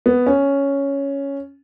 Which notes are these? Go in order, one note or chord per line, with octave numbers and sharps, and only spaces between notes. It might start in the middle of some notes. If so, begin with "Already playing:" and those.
B3
C#4